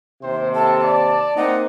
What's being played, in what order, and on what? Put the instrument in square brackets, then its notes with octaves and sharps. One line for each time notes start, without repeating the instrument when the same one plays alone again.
[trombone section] D#2 C3 [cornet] C5
[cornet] A4 [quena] A5
[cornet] D5
[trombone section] A#3 C4 D#4 [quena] F#5